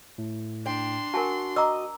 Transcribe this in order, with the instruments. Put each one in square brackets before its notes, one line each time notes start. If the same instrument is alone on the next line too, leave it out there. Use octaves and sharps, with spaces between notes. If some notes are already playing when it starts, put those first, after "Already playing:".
[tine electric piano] A2
[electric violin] D4 C6 [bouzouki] G5
[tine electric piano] F#4 [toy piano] A#4 G#5 A5
[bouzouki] D#5 [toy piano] A#5 D6 E6